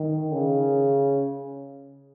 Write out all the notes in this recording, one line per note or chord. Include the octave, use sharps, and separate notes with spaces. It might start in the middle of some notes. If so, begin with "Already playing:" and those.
Already playing: D#3
C#3